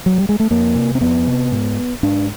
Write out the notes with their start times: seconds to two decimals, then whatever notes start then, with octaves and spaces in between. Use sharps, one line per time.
0.06 F#3
0.18 G3
0.29 G#3
0.40 A3
0.50 F2 A#3
0.75 C3
0.95 C4
1.01 F2 B3
1.27 C3
1.52 G#2
2.03 G#2 D4